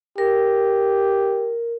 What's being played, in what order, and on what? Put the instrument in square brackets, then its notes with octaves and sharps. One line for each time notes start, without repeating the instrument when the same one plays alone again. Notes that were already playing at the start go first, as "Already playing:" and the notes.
[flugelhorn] G4 [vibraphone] A#4